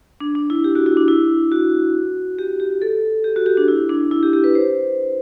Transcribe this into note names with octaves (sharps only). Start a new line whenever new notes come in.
D4
D4
E4
G4
F#4
E4
D4
E4
F#4
G4
G4
A4
G4
F#4
G4
D4
E4
D4
E4
G4
G4
B4
C5